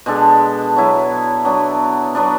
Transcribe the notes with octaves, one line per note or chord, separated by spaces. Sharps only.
B2 G#3 D4 A4
F#3 B3 E4
F#3 B3 D4
F#3 B3 D4